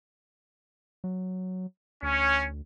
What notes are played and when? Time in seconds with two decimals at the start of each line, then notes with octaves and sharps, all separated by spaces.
1.04 F#3
2.03 D2 C#4